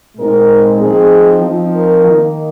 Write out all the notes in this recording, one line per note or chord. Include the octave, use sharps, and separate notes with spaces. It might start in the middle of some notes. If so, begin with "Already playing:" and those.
A#2 G#3 C4 D#4 A#4
F3 C4 D#4 G#4
F3 C4 D#4 F4
A#4
D#3 A#3 D#4